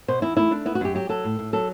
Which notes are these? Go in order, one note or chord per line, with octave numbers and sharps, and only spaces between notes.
B2 C5
E2 E4
A3 E4
A3 D4
B3 E4
F#4
F#2 G4
F#3 G4
F#3 A4
A2
A2
F#3 A4